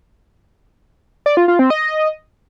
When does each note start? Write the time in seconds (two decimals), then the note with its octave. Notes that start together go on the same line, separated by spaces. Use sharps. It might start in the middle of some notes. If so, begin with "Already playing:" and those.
1.26 D5
1.37 F4
1.48 F4
1.59 C4
1.70 D#5